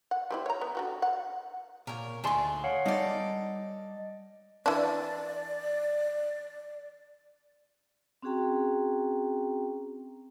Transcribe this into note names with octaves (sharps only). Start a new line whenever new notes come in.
F#5
G3 C4 E4
C#5 A#5
B3
D3 F#4 G4
F#5
A#2 A#4 C#5
D2 D#4 G#4 A5 C6
C#5 F5 F#5
G3 D#4 A4 D5 D#5
E3 D4 D5
C4 C#4 F#4 G#4 G5 A#5